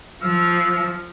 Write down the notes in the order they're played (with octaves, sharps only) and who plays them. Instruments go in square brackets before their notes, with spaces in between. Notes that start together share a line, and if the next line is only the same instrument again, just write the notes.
[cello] F3 [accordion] E6 F6